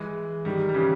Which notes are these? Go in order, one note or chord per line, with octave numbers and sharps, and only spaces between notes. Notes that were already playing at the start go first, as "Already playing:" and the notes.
Already playing: E3 G#3
D#3 G3
G3
C#3 E3